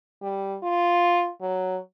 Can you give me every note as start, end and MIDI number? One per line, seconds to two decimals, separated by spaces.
0.22 0.57 55
0.63 1.30 65
1.41 1.78 54